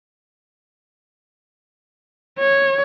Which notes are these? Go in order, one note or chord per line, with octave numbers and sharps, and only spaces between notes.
C#5